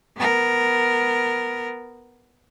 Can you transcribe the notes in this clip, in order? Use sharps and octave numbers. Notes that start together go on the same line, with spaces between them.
B3 A#4